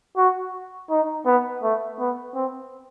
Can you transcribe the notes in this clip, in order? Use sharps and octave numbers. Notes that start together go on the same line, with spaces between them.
F#4
D#4
B3
A3
B3
C4